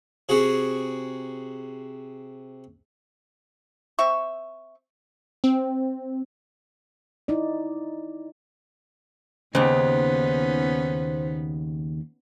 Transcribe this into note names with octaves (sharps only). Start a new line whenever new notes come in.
C3 F#4 G#4
C4 E5 C#6
C4
D#4 E4 D5
D#2 C#3 B3 C#4 D#4 C5